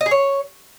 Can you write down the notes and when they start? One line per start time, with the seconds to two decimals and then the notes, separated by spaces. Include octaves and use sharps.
0.01 D#5
0.06 G#4
0.11 C#5